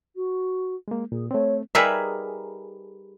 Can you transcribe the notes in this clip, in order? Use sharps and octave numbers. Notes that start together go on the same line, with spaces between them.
F#4
G#3 A#3
A#2 G#4
A3 C4 C#5
G3 D#4 G#4 A#4 B4 E5